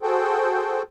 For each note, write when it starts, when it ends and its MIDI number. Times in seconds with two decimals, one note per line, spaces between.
0.02 0.82 66
0.02 0.82 68
0.02 0.82 69
0.02 0.82 72
0.02 0.82 79